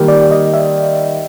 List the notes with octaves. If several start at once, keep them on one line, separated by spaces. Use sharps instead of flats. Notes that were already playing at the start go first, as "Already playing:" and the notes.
Already playing: D#3 G3 A#3 D#4
D5
D#5
E5